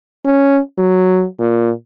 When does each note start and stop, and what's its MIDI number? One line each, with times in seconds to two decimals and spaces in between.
0.25 0.59 61
0.78 1.25 54
1.40 1.70 46